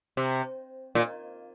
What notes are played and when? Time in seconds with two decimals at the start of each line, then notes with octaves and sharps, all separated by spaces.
0.17 C3
0.95 A#2